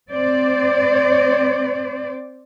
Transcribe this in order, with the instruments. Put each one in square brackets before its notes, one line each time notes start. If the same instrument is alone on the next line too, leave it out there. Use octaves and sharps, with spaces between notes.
[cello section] C4 C5 D5